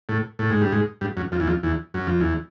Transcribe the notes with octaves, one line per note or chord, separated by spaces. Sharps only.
A2
A2
G#2
G2
G#2
G2
F#2
F2
E2
F2
E2
F#2
F2
E2